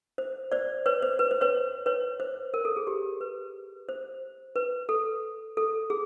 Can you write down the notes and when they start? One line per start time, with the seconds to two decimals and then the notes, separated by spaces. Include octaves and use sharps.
0.18 C5
0.52 C5 D5
0.86 B4 C#5
1.02 C5
1.19 B4
1.31 C5
1.41 B4 C#5
1.86 B4 C#5
2.20 C5
2.54 A#4
2.65 A4
2.77 G#4
2.87 G4
3.21 B4
3.89 C5
4.56 B4
4.89 A4
5.57 A4
5.90 G#4